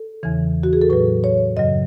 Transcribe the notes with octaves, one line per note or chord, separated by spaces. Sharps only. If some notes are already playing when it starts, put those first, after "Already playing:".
Already playing: A4
E2 C#3 E3
F#4
G#4
A4
A2 F#3 B4
C#5
F#2 C#3 F#3 D#5